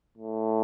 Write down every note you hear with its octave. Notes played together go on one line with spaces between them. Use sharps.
A2